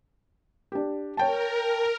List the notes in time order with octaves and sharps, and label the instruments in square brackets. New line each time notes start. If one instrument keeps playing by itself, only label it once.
[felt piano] D4 G4
[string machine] A#4 [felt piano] C#5 G5 A5